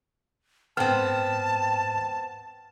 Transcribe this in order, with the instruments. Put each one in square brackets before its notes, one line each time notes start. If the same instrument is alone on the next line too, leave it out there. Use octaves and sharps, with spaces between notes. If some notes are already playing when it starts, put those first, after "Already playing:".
[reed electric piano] G#2 G5 F6 [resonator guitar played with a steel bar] B3 C4 [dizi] A5